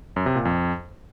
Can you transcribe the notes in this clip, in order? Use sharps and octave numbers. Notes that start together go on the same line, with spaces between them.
F#2
C3
A#2
F2